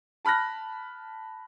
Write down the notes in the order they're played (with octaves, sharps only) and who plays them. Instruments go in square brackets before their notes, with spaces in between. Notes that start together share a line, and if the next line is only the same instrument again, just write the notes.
[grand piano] A5 B5 F6 F#6 A#6